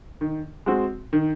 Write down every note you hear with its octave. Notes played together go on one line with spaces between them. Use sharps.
D#3
G#3 C4 F#4
D#3